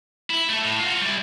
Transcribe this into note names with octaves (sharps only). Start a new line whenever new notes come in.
E4
A3 A4
A2
F4 F#4
G3 E4